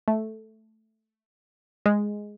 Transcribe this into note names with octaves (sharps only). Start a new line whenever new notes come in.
A3
G#3